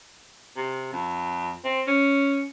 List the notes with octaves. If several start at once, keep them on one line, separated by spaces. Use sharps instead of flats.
C3
F2
C4
C#4